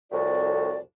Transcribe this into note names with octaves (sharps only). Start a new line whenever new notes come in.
C2 F2 A2 F#4 D5